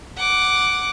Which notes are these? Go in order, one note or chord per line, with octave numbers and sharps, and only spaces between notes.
F#5 D6